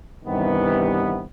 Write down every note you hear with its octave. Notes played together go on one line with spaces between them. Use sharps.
G2 C3 D#3 E3 B3